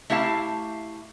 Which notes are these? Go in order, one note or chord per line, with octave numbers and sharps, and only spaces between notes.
A3 E4 G4 F5 A5